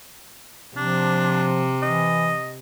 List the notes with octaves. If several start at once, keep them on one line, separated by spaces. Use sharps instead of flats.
C3 F3 D4
E3 D#5